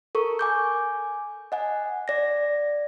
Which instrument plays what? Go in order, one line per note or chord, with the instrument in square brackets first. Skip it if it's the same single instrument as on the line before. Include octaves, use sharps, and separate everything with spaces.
[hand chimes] A4 A#4 C#6
G#5 D6 G6
D#5 F#5 G#5
D5 A#6